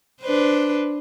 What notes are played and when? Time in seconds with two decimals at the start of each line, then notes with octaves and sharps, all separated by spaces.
0.21 D4 B4 C5